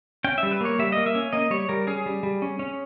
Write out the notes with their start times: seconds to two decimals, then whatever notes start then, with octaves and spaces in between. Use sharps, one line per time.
0.24 C#4 G5
0.38 E5
0.43 G3
0.51 B4
0.61 A#3 C#5
0.79 G3 E5
0.92 A#3 D#5
1.06 E5
1.15 C#4
1.33 A#3 D#5
1.50 G3 C#5
1.69 G3 A#4
1.87 C#4 G#4
2.06 G3
2.23 G3
2.42 C#4
2.59 C#4